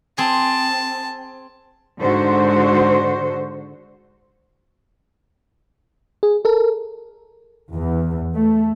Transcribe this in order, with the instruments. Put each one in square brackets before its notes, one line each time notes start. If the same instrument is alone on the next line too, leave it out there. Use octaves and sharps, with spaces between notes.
[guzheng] C4 G#4 [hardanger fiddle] A5
[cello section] G#2 D3 F#4 C5
[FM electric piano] G#4
A4 A#4
[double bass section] E2
A3